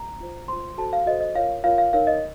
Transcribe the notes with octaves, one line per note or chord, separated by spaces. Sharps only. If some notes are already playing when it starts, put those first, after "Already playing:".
Already playing: A#5
F4 C5
F4 C5 C6
F#4 A4 C5 A5
F5
F#4 A4 C5 D#5
D#5
F4 A#4 C#5 F5
F4 A#4 C#5 F5
F5
D#4 A#4 C#5 F5
D#5